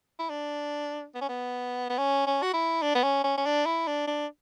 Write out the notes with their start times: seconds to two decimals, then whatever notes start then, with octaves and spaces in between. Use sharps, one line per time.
0.19 E4
0.30 D4
1.15 B3
1.21 C#4
1.29 B3
1.90 B3
1.98 C#4
2.27 C#4
2.42 F#4
2.54 E4
2.82 D4
2.95 B3
3.03 C#4
3.24 C#4
3.38 C#4
3.46 D4
3.66 E4
3.87 D4
4.07 D4